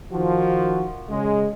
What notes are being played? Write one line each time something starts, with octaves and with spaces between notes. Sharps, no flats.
D#3 F3 F#4
C#3 G#3